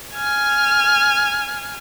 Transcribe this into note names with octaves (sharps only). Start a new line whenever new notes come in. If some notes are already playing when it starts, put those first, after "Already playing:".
G#5 F6